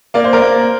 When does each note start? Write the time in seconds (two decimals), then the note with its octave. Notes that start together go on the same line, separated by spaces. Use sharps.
0.14 A#3 D5
0.24 C5
0.33 A#4 D5
0.41 A#3